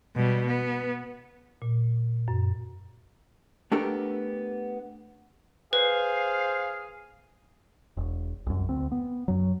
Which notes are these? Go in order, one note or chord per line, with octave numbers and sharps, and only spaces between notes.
B2 G3
B3
A#2
F#2
A3 B3 D4 G4 A4 A#4
G#4 B4 C5 F5
E1
C2 F#2
D2 C4
B3
F#2 F#3